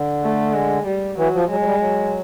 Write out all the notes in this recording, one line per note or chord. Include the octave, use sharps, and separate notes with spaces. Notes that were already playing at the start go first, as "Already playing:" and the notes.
Already playing: D3
A3
G#3
G3
E3 F#3
F3
F#3 G#3
F#3
G3
F#3